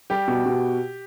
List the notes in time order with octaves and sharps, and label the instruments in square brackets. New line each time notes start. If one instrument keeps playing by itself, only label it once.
[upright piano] G3 G4
B2
B2